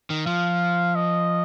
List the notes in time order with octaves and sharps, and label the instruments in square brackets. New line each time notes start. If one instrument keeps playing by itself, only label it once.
[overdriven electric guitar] D#3
[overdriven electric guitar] F3 [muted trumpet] F5
[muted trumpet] D#5